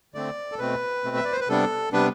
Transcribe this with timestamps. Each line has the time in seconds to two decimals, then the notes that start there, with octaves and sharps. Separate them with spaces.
0.14 D3 A3 C4 D5
0.52 A4
0.59 B2 A3 C4 B4
1.04 B2 A3 C4
1.16 E5
1.25 D5
1.32 C5
1.41 B4
1.48 C3 G3 B3 D4 A4
1.93 C3 G3 B3 D4 B4